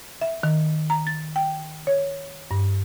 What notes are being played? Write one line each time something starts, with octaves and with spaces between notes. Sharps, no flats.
E5
D#3
A#5
A6
G5
C#5
G2